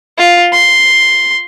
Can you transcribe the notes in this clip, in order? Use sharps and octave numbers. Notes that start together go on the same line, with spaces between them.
F4
C6